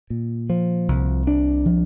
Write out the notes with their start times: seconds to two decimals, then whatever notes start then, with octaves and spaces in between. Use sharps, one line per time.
0.10 A#2
0.50 F3
0.88 C2
1.27 D4
1.66 F3